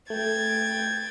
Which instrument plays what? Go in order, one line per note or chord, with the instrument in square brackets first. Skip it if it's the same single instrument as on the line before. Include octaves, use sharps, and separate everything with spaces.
[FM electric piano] A3 [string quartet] G5 G#6 A6